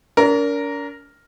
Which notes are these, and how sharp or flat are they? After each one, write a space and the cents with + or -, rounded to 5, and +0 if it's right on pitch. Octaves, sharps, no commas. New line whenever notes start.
D4 -45 A#4 +0